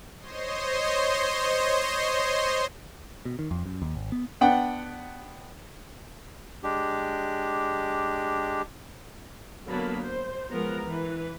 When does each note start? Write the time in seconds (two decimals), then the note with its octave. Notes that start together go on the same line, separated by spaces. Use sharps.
0.19 C5 C#5 D#5 C6
3.25 B2
3.39 D#3
3.51 F2
3.66 F#2
3.82 D#2
3.95 G#1
4.12 B3
4.41 B3 D4 F#5 G5
6.63 G#3 D4 G4
9.67 D3 F#3 A#3 B3 A5 B5
10.02 C5
10.50 F3 G#3 B3 A#4 A#5
10.85 E3 B4